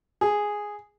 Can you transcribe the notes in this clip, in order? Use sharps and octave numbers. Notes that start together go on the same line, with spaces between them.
G#4